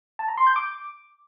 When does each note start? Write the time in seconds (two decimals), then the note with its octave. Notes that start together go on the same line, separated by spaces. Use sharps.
0.19 A5
0.28 A#5
0.37 C6
0.47 G6
0.56 D6